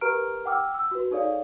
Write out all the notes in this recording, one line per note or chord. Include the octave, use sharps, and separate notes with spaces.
G4 A#4 B4 A#5 F6 D7
F#5 G5 D6 E6 F6
E6
F#4 B4
D#4 G#4 A4 C#5 D5 F5